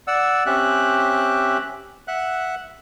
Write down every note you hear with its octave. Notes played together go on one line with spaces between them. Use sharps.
D5 F#5 E6
C4 C#4 G4 E5 F#6
E5 F#5 F#6